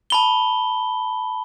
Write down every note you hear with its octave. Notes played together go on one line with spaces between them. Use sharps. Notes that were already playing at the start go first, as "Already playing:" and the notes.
A5 B5 G7